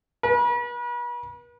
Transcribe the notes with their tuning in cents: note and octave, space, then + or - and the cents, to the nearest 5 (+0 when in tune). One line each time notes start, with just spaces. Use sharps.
B4 -40